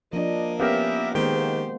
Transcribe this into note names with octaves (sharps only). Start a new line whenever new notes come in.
F3 A#3 D4 D#5
B3 C#4 G4 A#4 E5 F5
D#3 G#3 A#3 B3 G4 C5